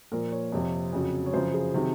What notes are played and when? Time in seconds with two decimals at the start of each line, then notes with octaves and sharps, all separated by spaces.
0.12 A#2 F3 A#4
0.32 C#5
0.52 F2 C3 F3
0.93 F2 C#3 F#3
1.26 C#5
1.33 F#2 C#3 F3 C5
1.54 G#4
1.74 C3 D#3 F#3